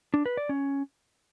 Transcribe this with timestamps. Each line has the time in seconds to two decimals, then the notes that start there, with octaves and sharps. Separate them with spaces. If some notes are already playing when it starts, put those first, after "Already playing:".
0.14 D4
0.26 B4
0.37 D5
0.49 C#4